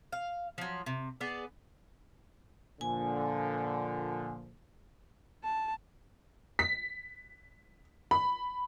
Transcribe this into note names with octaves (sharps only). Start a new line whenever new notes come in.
F5
F3 F#3
C3
B3 G#4 D5
A#2 D3 F3 G#5
A5
B6
B5